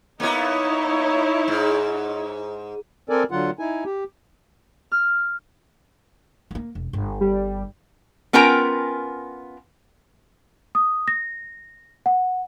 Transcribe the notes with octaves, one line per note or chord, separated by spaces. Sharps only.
A#3 B3 D#4 E4 C#5
G#2
C4 A4 A#4 D5 G#5
D3 F#3 F4 F#5
D#4 E4 G#5
G4
F6
A3 A#3
E1
G1
G3
B3 C#4 F4 A#4 G5 A#5
D#6
A#6
F#5